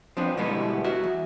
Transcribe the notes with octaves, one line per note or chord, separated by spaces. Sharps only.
F3 B3 C4 D4
B2 D3 G3 G#3 B3 E4
F#4 E5
E2